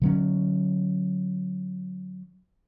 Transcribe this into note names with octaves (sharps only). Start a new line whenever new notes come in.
D3 F#3 C#4